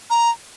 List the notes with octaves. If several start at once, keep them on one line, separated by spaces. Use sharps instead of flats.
A#5